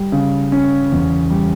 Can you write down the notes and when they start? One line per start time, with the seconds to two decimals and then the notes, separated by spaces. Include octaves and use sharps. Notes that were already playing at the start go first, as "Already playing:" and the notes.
Already playing: G3
0.12 C#3
0.52 C#4
0.92 E2
1.30 G3